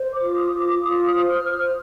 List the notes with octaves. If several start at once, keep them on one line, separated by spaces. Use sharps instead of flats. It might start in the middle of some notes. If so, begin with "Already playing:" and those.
Already playing: C5
D6
F4
D#6
F4
D6
F4 D#6
D#6
C5
F6
C5
F6